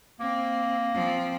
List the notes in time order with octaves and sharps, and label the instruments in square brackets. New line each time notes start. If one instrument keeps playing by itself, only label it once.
[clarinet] A#3 [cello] C4
[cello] F3 C4